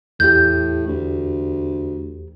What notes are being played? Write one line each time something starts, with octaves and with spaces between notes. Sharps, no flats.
E2 A2 G4 G6
D2